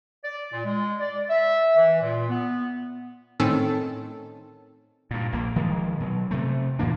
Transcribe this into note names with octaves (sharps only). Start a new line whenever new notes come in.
D5
A#2
G#3
D5
E5
E3
A#2
B3
A2 D#3 C4 C#4 A4
G2 A#2
A#1 A#3
D#3 F3 G#3
B2 F#3
C3 A3
A2 E3 A#3 D4